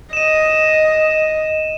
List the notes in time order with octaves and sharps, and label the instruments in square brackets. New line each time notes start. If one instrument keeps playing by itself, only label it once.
[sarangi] D#5 [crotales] D#7 E7